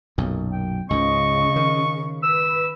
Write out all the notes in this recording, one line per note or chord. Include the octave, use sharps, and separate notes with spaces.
B1 F#2 A#2
G5
C#2 G#2 C#3 D#5 C#6
D#3
B4 E6